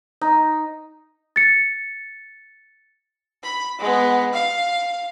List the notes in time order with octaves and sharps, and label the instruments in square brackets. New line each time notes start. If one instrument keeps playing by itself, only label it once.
[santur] D#4
[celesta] A6 C#7
[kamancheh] B5
G#3 B3
F5